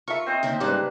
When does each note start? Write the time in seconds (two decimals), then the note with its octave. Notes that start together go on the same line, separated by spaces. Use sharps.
0.08 F4 A4 A#4 E5 C#6
0.27 C4 C5 D#5
0.43 D#2 D3 A3
0.60 G#2 C#3 G3 A#3 D4 G4 B4